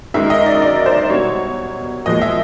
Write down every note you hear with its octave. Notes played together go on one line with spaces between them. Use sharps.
F#2 D#3 G#3 E5
D#5
D5
D5
C5
B2 G3 C#5
A#2 F3 G#3 D#5
E5